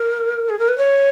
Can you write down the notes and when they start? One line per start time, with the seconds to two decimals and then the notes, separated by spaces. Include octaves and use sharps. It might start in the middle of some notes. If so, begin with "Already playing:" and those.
Already playing: A#4
0.49 G#4
0.59 A#4
0.69 B4
0.78 C#5